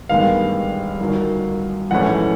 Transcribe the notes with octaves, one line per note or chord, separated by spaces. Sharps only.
A1 G2 D#3 G#3 B3 F5
G1 F#2 D#3 F#3
A#1 G#2 E3 A3 C#4 F#5